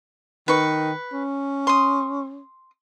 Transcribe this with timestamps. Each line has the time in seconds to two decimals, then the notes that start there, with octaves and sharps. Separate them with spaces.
0.48 D#3 B4 C#6
1.13 C#4
1.67 C6 D#6